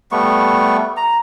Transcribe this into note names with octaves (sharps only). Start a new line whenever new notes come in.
G3 A3 B3 C#6
A#5